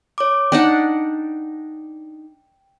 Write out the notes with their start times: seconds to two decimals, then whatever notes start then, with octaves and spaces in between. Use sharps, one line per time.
0.18 C#5 D6
0.52 D4 D#4 F#5 G5